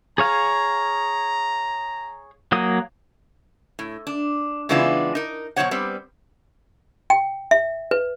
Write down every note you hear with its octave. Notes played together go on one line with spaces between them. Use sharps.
G#4 C#5 F5 A#5
F#3 A#3 D#6
A2
D4
C#3 E3 G#3 B3 D4 F4
D#4 A#4
B2 F#3 A#3 C5 C#5 F#5
G3 B3 C4
G5
E5
B4